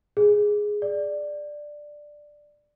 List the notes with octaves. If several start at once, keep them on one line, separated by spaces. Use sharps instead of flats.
G#4
D5